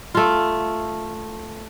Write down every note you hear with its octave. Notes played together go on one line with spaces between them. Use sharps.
A3 F4